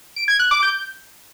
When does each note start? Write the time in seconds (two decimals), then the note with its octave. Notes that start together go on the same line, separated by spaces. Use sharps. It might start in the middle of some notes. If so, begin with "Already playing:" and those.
0.16 D7
0.28 G#6
0.39 F#6
0.51 D6
0.63 G6